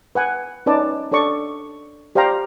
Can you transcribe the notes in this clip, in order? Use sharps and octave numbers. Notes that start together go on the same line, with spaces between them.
B4 F#5 G#5
C#4 D#4 B4 D5 A5
D4 A4 C#5 D5 C#6
G4 C5 D5 F5 G5 A#5